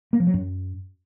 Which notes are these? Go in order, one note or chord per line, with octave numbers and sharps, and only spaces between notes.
A#3
F3
F#3
F#2